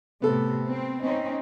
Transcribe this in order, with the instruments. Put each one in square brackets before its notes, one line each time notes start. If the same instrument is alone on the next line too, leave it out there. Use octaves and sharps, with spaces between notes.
[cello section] A2 C3 [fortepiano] B3 A4
[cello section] C4
C4 C#4 D#4